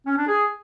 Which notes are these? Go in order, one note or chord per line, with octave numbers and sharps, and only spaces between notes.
C#4
D4
G#4